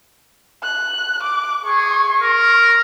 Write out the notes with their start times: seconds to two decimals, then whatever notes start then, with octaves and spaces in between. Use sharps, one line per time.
0.64 F#6
1.22 D6
1.65 G#4 C#6
2.22 A#4